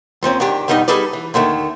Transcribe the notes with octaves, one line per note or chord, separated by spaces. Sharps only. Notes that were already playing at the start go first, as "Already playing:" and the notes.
D#2 F3 C4 C#4
G#2 D#3 D4 G4
B1 F2 G3 B3 D#4 D#5
G3 D#4 G#4 A4 B4 D5
E3
D#2 D3 D#3 A3